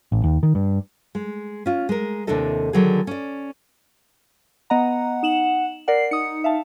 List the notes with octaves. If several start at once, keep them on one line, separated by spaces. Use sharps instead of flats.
A1
D#2
D#3
G2
G#3
C#4 F4
G#3 A#4
D#2 C3 D4 E4 A4 D#5
D3 D#3 F#3 D4 G#4
C#4 D5
B3 D#5 F#5 A#5
D#4 E7 F#7
A#4 D5 F#5 C7
D#4 D#6 C#7
E5 F5 A5